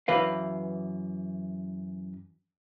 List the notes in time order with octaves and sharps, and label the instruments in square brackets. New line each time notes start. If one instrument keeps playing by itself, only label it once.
[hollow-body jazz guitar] F#2 E3 B4 F5